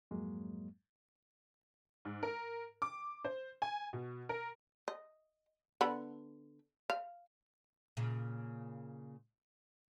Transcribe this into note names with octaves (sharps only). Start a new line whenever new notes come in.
F2 G#2 F#3 G#3 A#3
G#2
A#4
D6
C5
G#5
B2
A#4
D#5
D3 B3 B5
F5
A#2 C#3